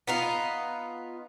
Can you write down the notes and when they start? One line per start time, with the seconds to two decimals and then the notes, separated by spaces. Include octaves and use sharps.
0.07 B3 D#4 F4